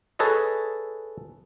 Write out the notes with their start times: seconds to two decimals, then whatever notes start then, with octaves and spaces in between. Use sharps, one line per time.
0.19 G#4 A4 B4 C#5 D#5